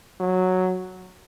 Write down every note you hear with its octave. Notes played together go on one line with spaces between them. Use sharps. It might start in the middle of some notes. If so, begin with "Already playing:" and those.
F#3